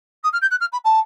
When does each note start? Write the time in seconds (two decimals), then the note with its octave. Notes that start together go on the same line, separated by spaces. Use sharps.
0.23 D#6
0.33 F6
0.41 G6
0.50 F#6
0.60 F6
0.72 B5
0.84 A5